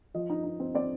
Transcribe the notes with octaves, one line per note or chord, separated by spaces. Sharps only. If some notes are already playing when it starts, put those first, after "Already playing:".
F3 D#5
D#4
D#4
C4
C4 D5